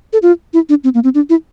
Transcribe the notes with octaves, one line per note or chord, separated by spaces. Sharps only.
A4
F4
E4
D4
C4
A#3
C4
D4
E4